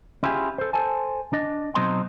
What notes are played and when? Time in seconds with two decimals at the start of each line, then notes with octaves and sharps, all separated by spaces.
0.23 C#4 E4 F4 G4 G#4
0.58 A4 C5
0.73 A4 C5 G#5 A5
1.33 D4 D#5
1.75 B2 F#3 C4 D#4 D#5 C6